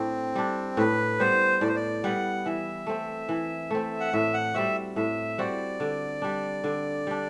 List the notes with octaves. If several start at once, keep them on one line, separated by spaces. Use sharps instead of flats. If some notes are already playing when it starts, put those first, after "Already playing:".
Already playing: A2 C4 D4
G3 D4
A2 B4
G3 B3 C5
A2 D5
C5
D5
G3 B3 F#5
E3 E5
A3 C4
E3
A3 C4
F#5
A2 E5
F#5
G3 C4 F#4 E5
A2 E5
G3 C4 F#4 D5
D3
G3 D4
D3
G3 D4